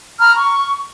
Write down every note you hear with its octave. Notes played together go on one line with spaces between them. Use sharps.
A#5 B5 F6
C#6